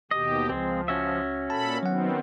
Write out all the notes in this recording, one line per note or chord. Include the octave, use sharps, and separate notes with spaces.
D#2 B2 G4 D#5
C#2 F3 G#3 C4
C#4 F#4 E5
A#2 A4 A5 B5
D#3 F#3 B3 C4 F#5